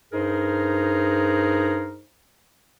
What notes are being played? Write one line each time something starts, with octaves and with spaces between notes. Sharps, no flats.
G2 D#4 G#4 A#4 C5